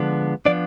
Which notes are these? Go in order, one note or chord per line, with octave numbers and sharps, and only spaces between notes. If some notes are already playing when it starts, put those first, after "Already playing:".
Already playing: D3 F3 G#3 B3 D4
F3 B3 D4 D5